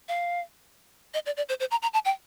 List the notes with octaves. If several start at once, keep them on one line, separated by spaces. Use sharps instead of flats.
F5
D#5
D5
D5
C5
C5
A#5
A#5
A5
G5